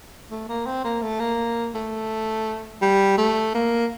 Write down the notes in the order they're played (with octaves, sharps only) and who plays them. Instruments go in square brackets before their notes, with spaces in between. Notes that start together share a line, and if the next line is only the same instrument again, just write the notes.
[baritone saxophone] A3
A#3
C4
A#3
A3
A#3
A3
G3
A3
A#3